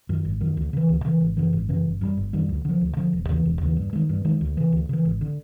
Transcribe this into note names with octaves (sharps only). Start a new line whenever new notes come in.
F#2 D#3
G#1
F#2 D#3
D2
C#3 E3
D2
C#3 E3
G#1
F#2 C#3 E3
G#1
F#2 C#3 E3
G1
F#2 D#3 G3
G1
F#2 D#3 G3
D2
D3 F3
D2
D3 F3
E1
D#2 C#3 E3
E1
D#2 C#3 E3
G2
D#3 G#3
G2
D#3 G#3
D2
C#3 E3
D2
C#3 E3
G#1
D3